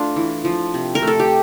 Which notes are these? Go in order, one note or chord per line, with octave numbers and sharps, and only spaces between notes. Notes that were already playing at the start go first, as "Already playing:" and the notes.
Already playing: A3 D4 F4
E3
F3
C3
A#4
A3
A4
G4